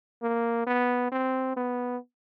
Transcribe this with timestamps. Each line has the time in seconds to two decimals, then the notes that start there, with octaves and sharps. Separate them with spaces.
0.22 A#3
0.67 B3
1.12 C4
1.57 B3